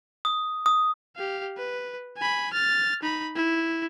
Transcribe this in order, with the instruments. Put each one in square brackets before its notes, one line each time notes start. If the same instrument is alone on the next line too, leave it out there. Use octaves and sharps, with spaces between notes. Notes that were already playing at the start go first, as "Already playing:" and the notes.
[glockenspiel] D#6
D#6
[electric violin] G4 F5
B4
G#5 B5
F6 A6
D#4 B5
E4